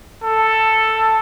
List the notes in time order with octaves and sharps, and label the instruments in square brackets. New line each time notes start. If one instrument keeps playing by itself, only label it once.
[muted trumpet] A4